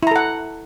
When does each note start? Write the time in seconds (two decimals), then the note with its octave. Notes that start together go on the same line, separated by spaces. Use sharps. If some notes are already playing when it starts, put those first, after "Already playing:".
0.03 E4
0.07 A#5
0.11 A4
0.16 F#5